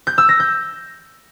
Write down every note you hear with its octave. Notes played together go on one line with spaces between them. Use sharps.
G6
E6
A#6
G6